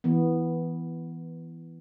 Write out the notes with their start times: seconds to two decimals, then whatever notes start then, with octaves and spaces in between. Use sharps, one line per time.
0.04 E3 B3